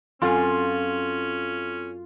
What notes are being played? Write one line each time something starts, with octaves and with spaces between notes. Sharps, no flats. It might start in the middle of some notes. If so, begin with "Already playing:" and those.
F#2 C4 C#4 F4 A4 F5